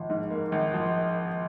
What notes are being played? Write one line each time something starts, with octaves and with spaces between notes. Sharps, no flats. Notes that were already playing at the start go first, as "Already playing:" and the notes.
Already playing: G#1 F3
G#2
A#3
G#1
F3